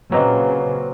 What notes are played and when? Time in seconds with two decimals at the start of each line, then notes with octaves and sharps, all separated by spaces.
0.12 A#2 C#3 F#3 A#3 C4 B4 D#5 A#5